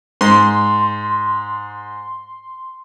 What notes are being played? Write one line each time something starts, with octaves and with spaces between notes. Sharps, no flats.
G#2 C6